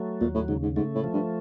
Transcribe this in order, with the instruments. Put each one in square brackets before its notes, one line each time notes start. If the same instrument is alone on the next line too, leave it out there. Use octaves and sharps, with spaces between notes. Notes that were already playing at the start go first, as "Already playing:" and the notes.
Already playing: [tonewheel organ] F#3 A3
[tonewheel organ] D#2 [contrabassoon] A#2
[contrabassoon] A2
[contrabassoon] G#2 [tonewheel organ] C#3
[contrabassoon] G#2
[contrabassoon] G#2 [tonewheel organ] A3
[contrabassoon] A2
[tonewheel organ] F3
[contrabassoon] G2